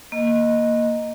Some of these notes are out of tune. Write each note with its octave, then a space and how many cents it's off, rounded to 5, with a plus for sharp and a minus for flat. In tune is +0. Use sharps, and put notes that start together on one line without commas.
A#3 +0 D#5 +0